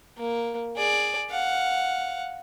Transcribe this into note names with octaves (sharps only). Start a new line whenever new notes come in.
A#3
G#4 D5
F5 F#5